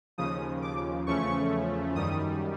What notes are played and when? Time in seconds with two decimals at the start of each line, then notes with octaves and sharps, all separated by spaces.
0.18 D#2 C#3 F3 D#6
0.62 D6
1.07 E2 C#3 F3 A3 C#4 C#6
1.95 F#2 D#3 G3 D#6